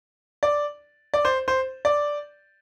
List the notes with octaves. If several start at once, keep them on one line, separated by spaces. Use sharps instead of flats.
D5
D5
C5
C5
D5